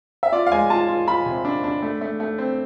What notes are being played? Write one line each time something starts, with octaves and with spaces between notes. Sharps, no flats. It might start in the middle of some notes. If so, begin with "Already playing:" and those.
E5
F4 D5
F5
G#3 G#5
F4 A5
F4
F4 B5
C3
D4
D4
A3
A3
A3
C4